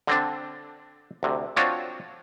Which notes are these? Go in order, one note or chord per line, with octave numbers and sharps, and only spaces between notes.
D3 C4 D4
D2 C3
C4 D4 F4 F#4 C#5